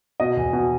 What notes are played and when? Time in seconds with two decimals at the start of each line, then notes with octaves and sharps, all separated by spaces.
0.20 B2 D#5
0.37 E2
0.53 B2